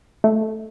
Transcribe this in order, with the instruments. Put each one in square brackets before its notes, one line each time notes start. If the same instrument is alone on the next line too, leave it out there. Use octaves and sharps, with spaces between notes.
[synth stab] A3